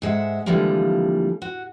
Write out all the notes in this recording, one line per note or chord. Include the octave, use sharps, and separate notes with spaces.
G#2 G#3 E5 F#5
D3 E3 F3 G3 G#3 A#3
F#4